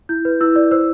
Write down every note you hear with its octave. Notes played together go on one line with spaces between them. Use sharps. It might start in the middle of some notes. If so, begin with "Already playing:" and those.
E4 G6
B4
E4 E6
D5
C5 E6